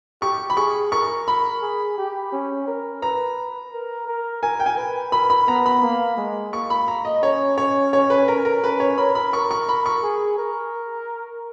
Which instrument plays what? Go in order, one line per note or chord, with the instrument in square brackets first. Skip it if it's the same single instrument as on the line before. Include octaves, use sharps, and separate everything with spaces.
[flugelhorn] G4 [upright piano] C#6
[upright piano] B5
[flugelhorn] G#4 [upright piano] C#6
[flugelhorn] A#4 [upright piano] C#6
[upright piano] B5
[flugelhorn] G#4
G4
C#4
A#4
[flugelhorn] B4 [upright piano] A#5
[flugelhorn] A#4
A#4
[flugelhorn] A#4 [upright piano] G#5
[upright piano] G5
G#5
[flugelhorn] B4
[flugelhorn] A#4 [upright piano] B5
[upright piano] B5
[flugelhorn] B3 [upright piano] A#5
[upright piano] B5
[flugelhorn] A#3
G#3
[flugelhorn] A#3 [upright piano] C#6
[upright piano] B5
A#5
D#5
[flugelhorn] C#4 [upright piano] C#5
[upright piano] C#5
C#5
B4
A#4
A#4
[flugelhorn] C#4 [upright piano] B4
[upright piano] C#5
[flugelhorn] A#4 [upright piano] B5
[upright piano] B5
[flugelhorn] A#4 [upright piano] C#6
[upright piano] C#6
B5
C#6
[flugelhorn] G#4
A#4